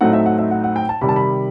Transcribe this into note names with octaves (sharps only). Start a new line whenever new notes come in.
A2 F#3 A3 C4 D#4 F#5
E5
F#5
E5
F#5
F#5
G5
A5
C3 D#3 G3 B5
A5
B5